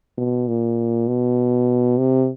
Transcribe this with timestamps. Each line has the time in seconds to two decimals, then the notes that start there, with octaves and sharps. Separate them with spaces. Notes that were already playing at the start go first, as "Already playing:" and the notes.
0.18 B2
0.48 A#2
1.08 B2
1.98 C3